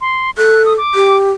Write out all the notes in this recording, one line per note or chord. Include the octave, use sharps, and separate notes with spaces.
C6
A4 F#6
D#6
D6
G4